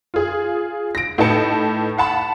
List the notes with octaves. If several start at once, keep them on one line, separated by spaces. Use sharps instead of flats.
F4 G#4
A#6 D7
A2 D#4 B4 A5 C#7
F5 F#5 A5 B5